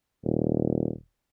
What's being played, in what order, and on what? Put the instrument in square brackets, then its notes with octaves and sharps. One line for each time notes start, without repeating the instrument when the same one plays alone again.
[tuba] D#1